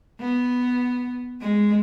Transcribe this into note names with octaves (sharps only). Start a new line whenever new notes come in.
B3
G#3